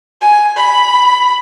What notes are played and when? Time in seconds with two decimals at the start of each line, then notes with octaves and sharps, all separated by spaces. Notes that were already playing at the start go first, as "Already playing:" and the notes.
0.21 G#5
0.57 B5